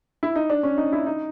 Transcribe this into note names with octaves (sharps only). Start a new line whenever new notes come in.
E4
D#4
D4
C#4
D#4
E4
D#4